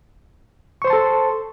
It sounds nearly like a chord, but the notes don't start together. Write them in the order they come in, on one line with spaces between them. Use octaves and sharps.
C#6 C5 C6 A5 A4